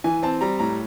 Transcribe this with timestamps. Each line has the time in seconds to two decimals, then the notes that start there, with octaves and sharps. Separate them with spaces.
0.04 E3 G#5
0.23 C4 A5
0.41 G3 A#5
0.59 A2 A#5